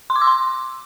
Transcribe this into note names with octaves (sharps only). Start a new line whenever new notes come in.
C6
D6
E6
C6